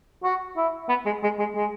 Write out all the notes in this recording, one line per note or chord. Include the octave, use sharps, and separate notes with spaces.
F#4
E4
B3
G#3
G#3
G#3
G#3